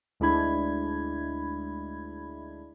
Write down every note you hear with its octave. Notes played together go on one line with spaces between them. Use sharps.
D2 G#3 D4 E4 B5 G#6